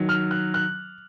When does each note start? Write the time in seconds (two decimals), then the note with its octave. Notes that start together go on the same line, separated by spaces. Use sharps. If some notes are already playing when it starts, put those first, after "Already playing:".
Already playing: D#3 F#3
0.09 F6
0.31 F#6
0.54 F#6